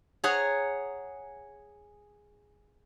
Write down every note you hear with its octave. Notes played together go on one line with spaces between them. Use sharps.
G#4 C#5 F#5 A#5